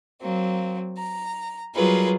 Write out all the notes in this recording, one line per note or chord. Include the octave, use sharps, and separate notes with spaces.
F#3 A#3 C4
A#5
F#3 G3 F4 G#4 A#4 B4